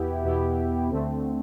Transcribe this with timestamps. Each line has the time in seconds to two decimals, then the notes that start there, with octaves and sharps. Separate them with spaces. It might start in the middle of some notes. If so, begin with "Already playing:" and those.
Already playing: E2 B2 B3 E4 G4
0.24 E2 B2 B3 E4 G4
0.90 D2 D3 A3 C4